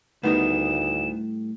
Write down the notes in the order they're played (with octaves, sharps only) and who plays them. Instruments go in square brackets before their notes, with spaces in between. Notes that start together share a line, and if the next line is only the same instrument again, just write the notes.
[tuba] D2 [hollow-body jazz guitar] A2 G3 D#5 [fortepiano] D#3 B3 [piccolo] E7